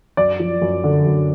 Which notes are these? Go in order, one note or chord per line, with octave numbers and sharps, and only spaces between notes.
F#2 D5
F3
F#2
D3
F#2